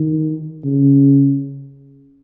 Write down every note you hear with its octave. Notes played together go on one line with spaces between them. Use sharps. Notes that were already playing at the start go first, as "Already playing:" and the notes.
Already playing: D#3
C#3